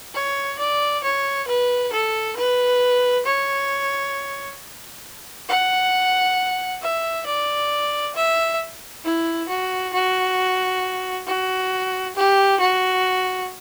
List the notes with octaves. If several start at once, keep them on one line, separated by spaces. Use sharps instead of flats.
C#5
D5
C#5
B4
A4
B4
C#5
F#5
E5
D5
E5
E4
F#4
F#4
F#4
G4
F#4